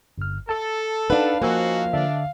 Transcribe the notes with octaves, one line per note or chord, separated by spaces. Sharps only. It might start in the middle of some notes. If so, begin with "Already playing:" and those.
G1 F6
A4 A5
D4 D#4 B4 F5 F#5
F3 A#3 C#4 D#4 F#4 C5 G#5 E6
D3 D4 E5